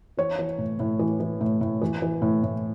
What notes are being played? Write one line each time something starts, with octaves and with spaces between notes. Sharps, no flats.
E3 C#5
E3
A2
A2
E3
E3
A2
A2
E3
E3
A2
A2